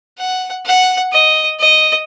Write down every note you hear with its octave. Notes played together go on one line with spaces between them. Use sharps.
F#5
F#5
D#5
D#5